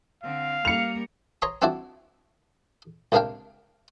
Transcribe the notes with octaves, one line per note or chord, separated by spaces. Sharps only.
D3 C4 F5
G3 A#3 C#7 F7
C#5 A#5 C6 D#6
C4 D4 E4 F#4 D5
C#2 C3 A#3 D4 F5 G5